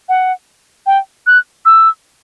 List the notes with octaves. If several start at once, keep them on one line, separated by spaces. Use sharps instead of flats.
F#5
G5
F#6
E6